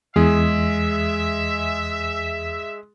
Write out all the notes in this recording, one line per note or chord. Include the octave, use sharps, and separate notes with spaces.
E2 G#3 G#4 E5